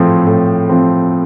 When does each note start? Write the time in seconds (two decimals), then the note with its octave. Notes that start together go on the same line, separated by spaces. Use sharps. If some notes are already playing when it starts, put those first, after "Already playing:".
Already playing: A2 F3 C4
0.27 A2
0.69 F3 C4